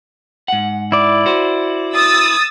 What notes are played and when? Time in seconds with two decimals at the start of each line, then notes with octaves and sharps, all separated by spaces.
0.48 G#2 F#5
0.92 E4 D5
1.26 F#4 C5
1.95 D#6 E6 A6